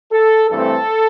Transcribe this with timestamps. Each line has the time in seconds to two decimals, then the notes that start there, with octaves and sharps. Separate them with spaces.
0.13 A4
0.50 G2 E3 A3 C4 A4